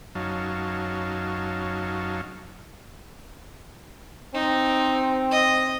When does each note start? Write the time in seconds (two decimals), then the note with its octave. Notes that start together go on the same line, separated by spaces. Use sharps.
0.15 F#2 F#3 D#4 C#5 F5 A5
4.34 C4 D#4
5.31 D#5